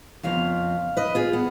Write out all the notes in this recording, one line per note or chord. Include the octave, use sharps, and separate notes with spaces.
F2 C#3 F3 B3 F5
B4 D#5
F4 G#4
B3